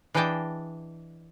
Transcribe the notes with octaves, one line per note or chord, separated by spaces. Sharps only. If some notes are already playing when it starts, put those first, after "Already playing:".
E3 D4 G#4 D#5 G5 A5